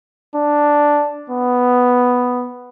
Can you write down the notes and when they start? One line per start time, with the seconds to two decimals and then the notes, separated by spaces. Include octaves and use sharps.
0.36 D4
1.30 B3